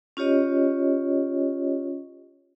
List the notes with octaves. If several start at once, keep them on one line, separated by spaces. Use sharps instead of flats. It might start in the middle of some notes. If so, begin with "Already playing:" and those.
C#4 F4 G4 C#5 D#5